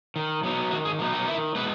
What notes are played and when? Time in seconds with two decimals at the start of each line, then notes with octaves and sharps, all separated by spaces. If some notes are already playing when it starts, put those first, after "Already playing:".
0.16 D#3
0.43 F#3 B3 D#4
0.71 D#3 F#4
0.85 G#4
0.99 F#3 B3 D#4
1.14 F#4
1.27 D#3 E4
1.55 G#3 B3 D#4 B4